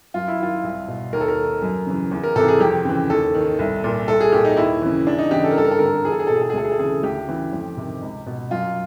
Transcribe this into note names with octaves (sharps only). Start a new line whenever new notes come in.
F#2 F4
E4
D#3 F4
C2
B2
D#2 A#4
A4
A#4
D#3
F#2
C#3 E3
E2
A#4
C3 E3 A4
G#4
F2 G4
C#3 E3
D#2 A4
D#3
C2
A#2
C2 A4
G#4
A#2 G4
D#4
D#2 E4
C#3 E3
E2 D4
D#4
C#3 E3 G4
A4
A#4
G2 A4
A#4
A4
D3 A#4
A4
E2 G#4
A4
G#4
B2 A4
G#4
A4
G#4
D2 A4
G#4
A4
C#3 E3 G#4
D2 G4
C#3 E3
F2
C3 D#3
C#2
B2
F#2 F4